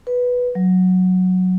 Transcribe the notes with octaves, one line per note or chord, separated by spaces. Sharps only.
B4
F#3